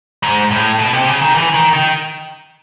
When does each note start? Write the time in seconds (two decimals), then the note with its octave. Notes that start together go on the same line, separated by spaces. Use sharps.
0.23 G#2
0.51 A2
0.79 B2
0.93 C3
1.07 C#3
1.22 D#3
1.35 E3
1.54 D#3
1.73 D#3